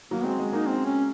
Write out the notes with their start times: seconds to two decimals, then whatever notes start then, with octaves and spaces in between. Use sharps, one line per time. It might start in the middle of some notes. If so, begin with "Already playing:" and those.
0.11 F#3 A#3
0.24 G#3 C4
0.39 G#3
0.53 A#3 D#4
0.67 C4
0.85 C#4